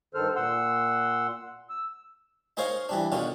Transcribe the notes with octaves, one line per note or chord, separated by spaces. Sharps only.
G2 D#3 A4 C5 F6
A#2 F#5 C6 E6
E6
D#4 G#4 A#4 C5 C#5 F5
E3 G3 D4
B2 D3 D#3 C#4 F4